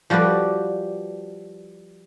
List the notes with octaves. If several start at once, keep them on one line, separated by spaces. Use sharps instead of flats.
F3 G3 F#4 G4 B4 D5